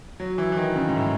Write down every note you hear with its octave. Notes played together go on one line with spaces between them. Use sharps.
F#3
E3
E3
D#3
C#3
G#2
A2